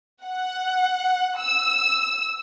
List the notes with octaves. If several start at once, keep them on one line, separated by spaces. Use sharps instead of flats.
F#5
E6